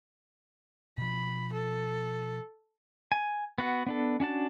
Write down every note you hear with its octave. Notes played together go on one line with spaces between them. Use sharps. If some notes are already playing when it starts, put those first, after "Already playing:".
B2 F3 B5
A4
G#5
B3 F#4 F#5
B3 D4 A4
C#4 D4 F#4 A5